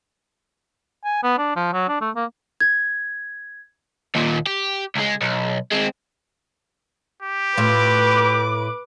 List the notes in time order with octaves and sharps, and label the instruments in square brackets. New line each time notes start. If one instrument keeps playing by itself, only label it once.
[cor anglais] G#5
B3
D4
F3
F#3
D4
A3
A#3
[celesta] G#6
[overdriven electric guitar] D#2 A#2
G4
C#2 G#3
B1
G#3 C4
[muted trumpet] G4
[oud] A2 F4 [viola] B4 D6